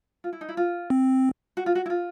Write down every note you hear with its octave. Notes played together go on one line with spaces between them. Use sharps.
F4
E4
D#4
E4
F4
C4
F#4
F4
F#4
E4
F4